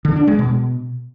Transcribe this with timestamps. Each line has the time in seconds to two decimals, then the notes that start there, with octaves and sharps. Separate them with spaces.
0.05 D3
0.16 D4
0.27 G#3
0.39 B2